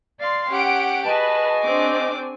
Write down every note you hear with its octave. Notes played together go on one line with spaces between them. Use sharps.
D5 F5 C6
C#4 G4 F#5 D7
F#4 G#4 B4 D#5 G#5 A5
C4 D4 D6